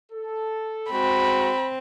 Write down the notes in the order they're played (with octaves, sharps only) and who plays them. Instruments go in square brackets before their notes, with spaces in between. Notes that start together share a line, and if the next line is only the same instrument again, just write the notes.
[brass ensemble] A4
[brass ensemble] G#3 F#4 [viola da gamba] C4 [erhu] B5